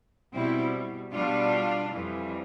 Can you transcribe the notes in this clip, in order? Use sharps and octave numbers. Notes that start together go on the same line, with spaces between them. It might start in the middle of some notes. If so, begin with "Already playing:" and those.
B2 G3 C4 E4
B2 G3 D4 F4
F2 E3 G3